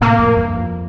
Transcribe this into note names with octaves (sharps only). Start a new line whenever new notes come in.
A2 C3 A#3
F2 A2
E2 G2
F2